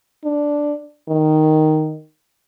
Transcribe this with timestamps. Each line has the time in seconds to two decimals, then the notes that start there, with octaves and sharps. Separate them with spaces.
0.25 D4
1.09 D#3